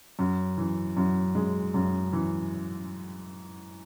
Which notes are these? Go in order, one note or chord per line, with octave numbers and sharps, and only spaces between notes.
F#2
E3
F#2
G#3
F#2
E3